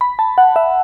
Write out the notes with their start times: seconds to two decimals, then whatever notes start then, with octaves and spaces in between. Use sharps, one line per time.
0.01 B5
0.19 A5
0.38 F#5
0.56 E5